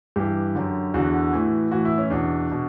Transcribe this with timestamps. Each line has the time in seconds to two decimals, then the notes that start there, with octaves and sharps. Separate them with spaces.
0.16 G2 E3 G4
0.55 F#2 D3
0.94 E2 D3 F#4
1.33 A2 E3
1.71 A2 E3 F#4
1.85 E4
1.98 C#4
2.10 E2 B2 D4
2.52 B2